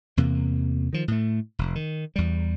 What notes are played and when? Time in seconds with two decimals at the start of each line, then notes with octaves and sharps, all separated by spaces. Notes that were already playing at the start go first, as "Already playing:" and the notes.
0.17 E2 C3 A#3
0.93 D#3 F3
1.08 A2 A3
1.59 F1
1.75 D#3
2.16 E2 G3